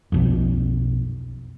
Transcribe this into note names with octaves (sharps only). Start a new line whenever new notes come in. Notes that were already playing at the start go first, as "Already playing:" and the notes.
B1 F2